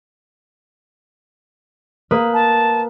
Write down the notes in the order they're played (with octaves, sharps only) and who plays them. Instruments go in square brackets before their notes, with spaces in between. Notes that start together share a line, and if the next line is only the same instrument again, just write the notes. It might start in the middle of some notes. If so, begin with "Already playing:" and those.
[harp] A#3 B4 D#6
[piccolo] A5